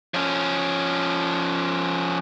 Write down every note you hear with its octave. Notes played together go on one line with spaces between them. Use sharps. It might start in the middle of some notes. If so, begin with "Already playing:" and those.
F3 C#4